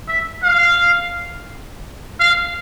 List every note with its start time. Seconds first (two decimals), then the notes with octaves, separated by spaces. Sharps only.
0.08 E5
0.43 F5
2.20 F5